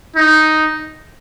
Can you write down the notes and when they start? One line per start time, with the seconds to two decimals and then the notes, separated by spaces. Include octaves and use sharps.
0.16 D#4